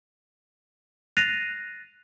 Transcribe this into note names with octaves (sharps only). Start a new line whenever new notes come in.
F#6 A6 A#6 C7 D#7 F7